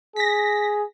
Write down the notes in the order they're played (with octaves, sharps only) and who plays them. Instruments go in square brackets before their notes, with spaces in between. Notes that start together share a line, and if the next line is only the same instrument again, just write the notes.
[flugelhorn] G#4 [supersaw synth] A#6 B6